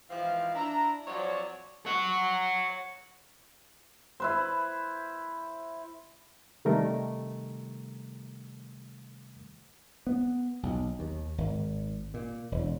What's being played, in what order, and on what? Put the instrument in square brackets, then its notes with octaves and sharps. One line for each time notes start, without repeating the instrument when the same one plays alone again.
[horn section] G#2 E3 F3 C4 F5
D4 E4 A#5
F3 F#3 C4 C#5 D5
[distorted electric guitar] C#5 F#5
[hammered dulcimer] E4 B4 C5
[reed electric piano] C3 D#3 G3 A3 A#4
[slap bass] B3
B1
D#2
G#1
A#2
E1